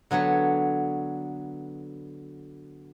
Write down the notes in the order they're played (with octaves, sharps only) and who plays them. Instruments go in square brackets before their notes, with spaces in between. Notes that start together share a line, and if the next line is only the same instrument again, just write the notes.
[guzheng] D3 F#3 B3 C#5